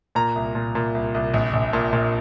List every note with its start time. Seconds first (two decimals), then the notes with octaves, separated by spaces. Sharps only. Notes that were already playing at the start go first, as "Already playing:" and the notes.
0.15 A#2 A#5
0.35 C2
0.55 A#2
0.75 A#2
0.95 C2
1.14 C2
1.34 A#1
1.53 A#1
1.73 A#2
1.93 A#2